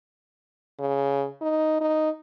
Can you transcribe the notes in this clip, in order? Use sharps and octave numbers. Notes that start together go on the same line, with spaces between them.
C#3
D#4
D#4